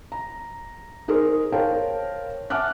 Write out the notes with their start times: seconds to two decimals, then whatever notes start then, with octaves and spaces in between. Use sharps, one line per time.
0.12 A#5
1.08 D#4 G#4 A#4 C5
1.52 A#4 C5 C#5 F5 G5 A5
2.50 E5 F#5 A5 D6 F6 F#6